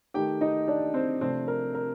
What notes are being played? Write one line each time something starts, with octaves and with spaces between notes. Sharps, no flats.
D#3 A3 D#4 G4 G5
D#4 D#5
D4 D5
C4 C5
C3 F3 A3 C4 D4 C5
A#4
A#4